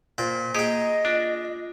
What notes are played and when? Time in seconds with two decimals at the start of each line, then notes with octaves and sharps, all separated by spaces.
0.18 A#2 C5 G5
0.55 A#3 G4 G#4 D#5 G5
1.05 D4 F4